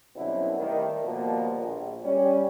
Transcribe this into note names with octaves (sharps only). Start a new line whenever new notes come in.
F#2 B2 D3 G3 C4 E4
D#3 G3 A3
D#2 B2 F3 G3 A#3
A#1
G3 C#4